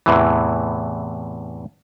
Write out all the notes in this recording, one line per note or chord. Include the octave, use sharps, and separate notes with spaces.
E2 A2 C3 E3